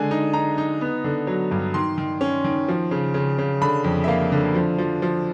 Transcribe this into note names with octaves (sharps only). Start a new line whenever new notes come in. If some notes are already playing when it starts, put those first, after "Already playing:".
Already playing: D3 G#3 G#5
D#4
D#4 A#5
D#4
B3
D3
F#3
G2
D#3 C6
D#3
C#4
D#3
F3
C#3
C#3
C#3
D3 B5
F2
E5
A#3 F5
D3
F3
F3
F3